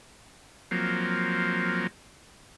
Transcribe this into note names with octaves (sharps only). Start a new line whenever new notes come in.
F3 F#3 A#3 C4